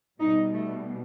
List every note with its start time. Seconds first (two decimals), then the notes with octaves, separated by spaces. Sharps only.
0.21 B2 G3 D#4
0.53 A3